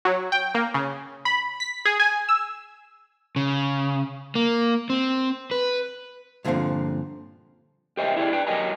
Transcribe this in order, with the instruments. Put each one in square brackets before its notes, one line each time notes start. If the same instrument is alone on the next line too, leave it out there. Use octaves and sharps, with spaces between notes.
[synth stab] F#3
G5
A#3
C#3
B5
B6
G#4
G#5
E6
[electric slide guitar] C#3
A#3
C4
B4
[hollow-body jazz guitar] G2 A#2 D3 D#3 F3 C4
[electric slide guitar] G4 A#4 C5 D#5 E5 G5
E4 G4 G#4 D5
D4 B4 G5
F#3 G4 A#4 D#5 G#5 A#5